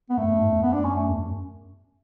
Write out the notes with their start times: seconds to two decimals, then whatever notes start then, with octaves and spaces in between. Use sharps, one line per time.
0.10 B3
0.17 F#2 A3
0.28 F#2
0.40 G#2
0.50 E2
0.62 F#2 B3
0.73 D4
0.84 C#4
0.96 A3
1.08 E2
1.19 F#2